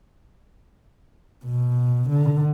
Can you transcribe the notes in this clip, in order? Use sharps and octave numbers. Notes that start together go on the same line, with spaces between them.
B2
D3